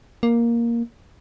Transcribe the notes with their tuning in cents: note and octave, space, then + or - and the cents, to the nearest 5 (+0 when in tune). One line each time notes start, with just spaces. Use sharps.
A#3 +5